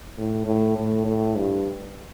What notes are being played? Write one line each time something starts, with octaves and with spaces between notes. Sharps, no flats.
A2
A2
A2
A2
G2